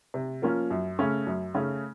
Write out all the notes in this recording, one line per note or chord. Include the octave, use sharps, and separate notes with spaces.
C3
F3 A#3 C#4 F4
F#2
C#3 A3 C#4
F#2
C#3 A3 C#4